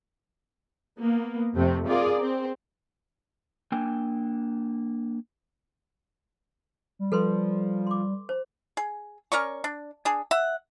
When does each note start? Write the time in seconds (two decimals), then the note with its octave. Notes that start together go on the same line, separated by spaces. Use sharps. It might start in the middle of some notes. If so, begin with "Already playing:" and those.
0.99 A#3 B3
1.55 F2 C3 A3 C4
1.87 F4 G#4 A#4 D5
2.20 C4
3.72 A#3 D4 G5 G#5
6.99 G3
7.12 F3 A4 B4 C6
7.87 C6 D6
8.29 C5
8.77 G#4
9.32 C#4 A#4 D5 C#6
9.64 D4
10.05 D4 G#4
10.31 E5 F#5